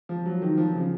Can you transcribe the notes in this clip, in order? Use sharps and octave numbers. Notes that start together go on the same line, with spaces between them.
F3
F#3
D#3
F3
C#3